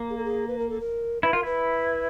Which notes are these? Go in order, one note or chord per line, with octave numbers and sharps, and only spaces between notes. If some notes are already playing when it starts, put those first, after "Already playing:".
Already playing: A#3
G#4
A4
G#4
B4
A#4
A4
A#4
E4 B4
F4 A#4
E4 B4